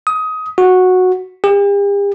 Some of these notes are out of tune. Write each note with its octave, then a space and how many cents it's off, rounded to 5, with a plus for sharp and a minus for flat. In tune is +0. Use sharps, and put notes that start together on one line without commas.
D#6 +20
F#4 -10
G4 +45